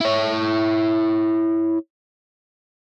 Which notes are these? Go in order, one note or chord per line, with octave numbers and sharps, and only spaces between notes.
E4 C#5